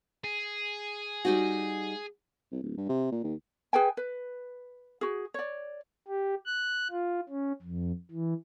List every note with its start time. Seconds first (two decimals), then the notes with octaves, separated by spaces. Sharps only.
0.24 G#4
1.25 G3 D#4 F#4
2.52 C2
2.63 D1
2.77 G2
2.89 C3
3.12 A#2
3.24 D#2
3.73 G#4 B4 G5 G#5
3.97 B4
5.01 F#4 G#4
5.34 C#5 D5
6.08 G4
6.46 F#6
6.91 F4
7.29 C#4
7.62 F2
8.11 E3